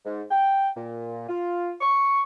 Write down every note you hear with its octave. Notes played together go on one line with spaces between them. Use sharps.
G#2
G5
A#2
F4
C#6